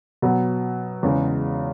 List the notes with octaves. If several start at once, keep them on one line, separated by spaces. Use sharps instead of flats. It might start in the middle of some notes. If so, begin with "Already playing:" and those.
B2 F#3 B3
E2 C#3 G#3